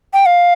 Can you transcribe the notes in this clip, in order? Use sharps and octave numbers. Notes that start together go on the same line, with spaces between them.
G5
F5